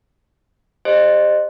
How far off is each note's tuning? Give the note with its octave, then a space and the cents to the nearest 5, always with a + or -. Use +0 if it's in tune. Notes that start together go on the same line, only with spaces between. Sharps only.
G4 +25 C5 +0 D#5 -35